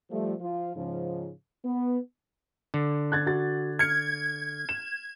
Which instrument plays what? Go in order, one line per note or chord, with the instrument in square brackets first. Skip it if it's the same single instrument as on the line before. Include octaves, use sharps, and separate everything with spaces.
[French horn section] F3 G3 A3
F3 F4
G#2 C#3 F3
B3
[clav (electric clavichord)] D3
[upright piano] F#6 G#6 A6
F#4 A6
[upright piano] F6 C#7 [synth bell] G#6
[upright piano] E7